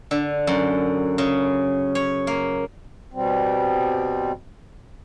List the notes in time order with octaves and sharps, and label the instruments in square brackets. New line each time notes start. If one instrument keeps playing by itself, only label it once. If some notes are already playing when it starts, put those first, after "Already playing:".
[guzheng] D3
F#2
C#3
C#5
A#3
[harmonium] B2 G3 C4